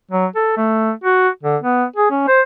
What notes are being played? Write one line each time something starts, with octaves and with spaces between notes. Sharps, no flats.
F#3
A4
A3
F#4
D3
B3
G#4
C#4
C5